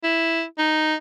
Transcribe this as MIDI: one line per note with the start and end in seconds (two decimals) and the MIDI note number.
0.03 0.43 64
0.58 0.95 63